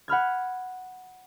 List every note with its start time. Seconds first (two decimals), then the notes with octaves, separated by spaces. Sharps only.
0.08 F#5 B5 F6 G#6